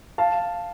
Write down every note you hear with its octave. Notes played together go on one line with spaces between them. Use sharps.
F5 A5